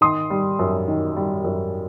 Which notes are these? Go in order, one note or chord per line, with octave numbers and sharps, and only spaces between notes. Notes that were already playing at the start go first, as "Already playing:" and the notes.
D#3 C6 D#6
G3
F#2
D#3
G3
F#2